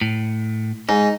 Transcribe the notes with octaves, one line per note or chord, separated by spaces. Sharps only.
A2
G#2 D#4